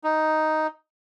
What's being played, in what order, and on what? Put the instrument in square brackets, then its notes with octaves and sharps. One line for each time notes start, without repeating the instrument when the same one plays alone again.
[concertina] D#4